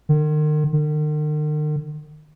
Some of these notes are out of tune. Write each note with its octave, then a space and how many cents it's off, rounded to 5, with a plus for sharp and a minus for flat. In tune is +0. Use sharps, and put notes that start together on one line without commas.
D#3 -40
D#3 -45